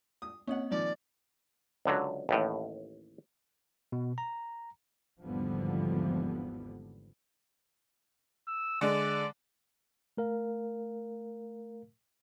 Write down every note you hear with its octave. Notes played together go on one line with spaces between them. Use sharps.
D#6
A#3 C4 C#4 D#5 F#5
A#2 D#3 F3 D5
C#2 D3 F#3
A1 D#2 A2
B2
A#5
G#1 E2 D3 F3 G3 B3
E6
D3 G#3 D5
A3 A#4 F5